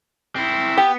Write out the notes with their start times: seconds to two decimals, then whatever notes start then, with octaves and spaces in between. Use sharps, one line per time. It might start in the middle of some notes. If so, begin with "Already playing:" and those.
0.36 C4 E4
0.78 B3 G4